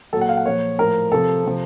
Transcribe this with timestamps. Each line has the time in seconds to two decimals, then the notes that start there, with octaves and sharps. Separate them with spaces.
0.13 A#2 F#3 A4
0.21 F#5
0.29 F5
0.37 F#5
0.46 A#2 F3 C#5
0.78 A2 F3 A#4
1.12 C3 F3 A4
1.44 C3 F3